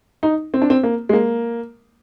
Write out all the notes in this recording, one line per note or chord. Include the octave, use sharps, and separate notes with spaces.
D#4
C4
D4
C4
A#3
G#3
A#3